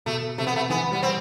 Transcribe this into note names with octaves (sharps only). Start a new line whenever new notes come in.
B2 A3
C3 A3
B3
A3
E3 B3
G3 B3
C4